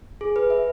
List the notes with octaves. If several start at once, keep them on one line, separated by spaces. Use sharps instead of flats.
G#4
B4
E5